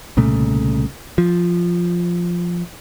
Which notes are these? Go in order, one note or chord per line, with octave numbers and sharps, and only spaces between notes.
C2 A#2 C#3 A3
F3